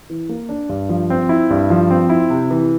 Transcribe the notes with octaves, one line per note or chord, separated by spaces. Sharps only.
E3
A#3
D4
G2
F3
C4
E4
G2
F3
C4
E4
C3
E3